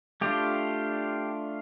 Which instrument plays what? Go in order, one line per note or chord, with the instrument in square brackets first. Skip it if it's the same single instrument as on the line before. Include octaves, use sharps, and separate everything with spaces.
[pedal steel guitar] A3 D4 F4 G4